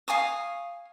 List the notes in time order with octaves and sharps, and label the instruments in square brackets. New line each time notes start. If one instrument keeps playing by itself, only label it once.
[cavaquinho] F5 G#5 C#6 D#6